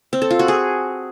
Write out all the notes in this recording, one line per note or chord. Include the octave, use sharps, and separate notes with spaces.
C4
A4
F4
F#4
G#4